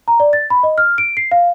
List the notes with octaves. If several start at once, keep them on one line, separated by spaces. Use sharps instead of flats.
A#5
D5
A6
B5
D#5
F6
D7
C7
F5